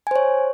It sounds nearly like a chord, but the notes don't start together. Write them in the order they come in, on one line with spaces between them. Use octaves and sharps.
G#5 C5 C#5